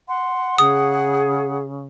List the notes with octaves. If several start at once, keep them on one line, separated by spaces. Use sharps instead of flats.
F#5 C6
C#3 G#4 D#6